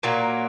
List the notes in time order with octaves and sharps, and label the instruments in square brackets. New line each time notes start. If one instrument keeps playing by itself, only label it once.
[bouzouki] A#2 F#3 A#3